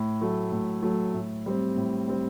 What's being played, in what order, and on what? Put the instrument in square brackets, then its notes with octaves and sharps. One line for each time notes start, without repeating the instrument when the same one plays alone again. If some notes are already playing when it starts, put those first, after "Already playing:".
Already playing: [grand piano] A2
F#3 A3
A2
F#3 A3
A2
G3 C4
A2
G3 C4